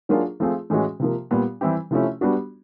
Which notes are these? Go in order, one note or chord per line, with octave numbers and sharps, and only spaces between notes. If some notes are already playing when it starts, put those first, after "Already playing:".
F#3 A#3 D4 F4 G#4
F3 A3 C4 F4 G#4
A2 E3 G#3 C#4 F#4
C3 F3 A#3
A#2 G3 B3
E3 G3 C4 E4 G4
C3 F3 A3 C#4 E4
G3 B3 D4 F#4